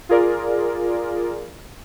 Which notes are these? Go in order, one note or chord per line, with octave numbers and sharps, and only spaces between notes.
F4 G#4 A#4 D5